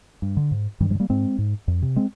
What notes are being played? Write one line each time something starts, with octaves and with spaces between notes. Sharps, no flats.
G2
D3
G#2
G2 D#3 G3
F3 G#3
D3
G3 A#3
G#2 G#3 C4
G#2
F2
C3
G#3 C4